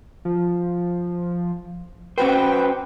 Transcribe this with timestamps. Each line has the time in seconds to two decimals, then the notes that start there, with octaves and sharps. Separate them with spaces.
0.25 F3
2.18 C#4 F#4 B4 C5 G5